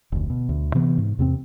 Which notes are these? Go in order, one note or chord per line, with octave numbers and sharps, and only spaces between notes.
F1 D2
B2
D2
C3 E3 B3
G#2
E2 C3 A#3 C4